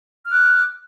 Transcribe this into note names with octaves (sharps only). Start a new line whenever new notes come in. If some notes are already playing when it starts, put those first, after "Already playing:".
D6 F6 F#6